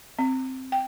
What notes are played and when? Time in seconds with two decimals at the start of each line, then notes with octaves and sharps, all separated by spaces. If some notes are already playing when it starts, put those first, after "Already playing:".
0.19 C4
0.72 G5